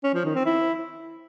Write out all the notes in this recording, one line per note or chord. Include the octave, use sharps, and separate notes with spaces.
C#4
F3
D#3
C4
E4